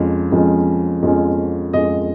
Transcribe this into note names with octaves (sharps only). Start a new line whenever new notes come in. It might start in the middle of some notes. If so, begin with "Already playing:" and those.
Already playing: F2 F3 G#3 C#4
F2 F3 G#3 C#4
F2 F3 G#3 C#4
F2 F3 G#3 C#4 D#5